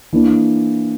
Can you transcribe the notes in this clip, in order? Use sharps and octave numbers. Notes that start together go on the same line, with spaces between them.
E3 A#3 D4